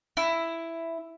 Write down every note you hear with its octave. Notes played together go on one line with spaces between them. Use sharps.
E4